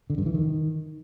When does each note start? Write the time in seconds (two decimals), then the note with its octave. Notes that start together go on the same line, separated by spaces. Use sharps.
0.10 D3
0.18 G2
0.26 E3
0.34 D#3